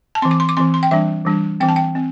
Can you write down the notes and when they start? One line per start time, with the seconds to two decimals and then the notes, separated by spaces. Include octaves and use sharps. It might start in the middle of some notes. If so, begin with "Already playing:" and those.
0.15 A5
0.22 C4 C6
0.25 E3
0.31 D6
0.40 C6
0.49 D6
0.57 E3 C4 C6
0.74 C6
0.83 G5
0.91 E3 G3 D4 E5
1.25 E3 G3 D4
1.60 E3 C4 G5
1.69 A5
1.76 G5
1.95 C4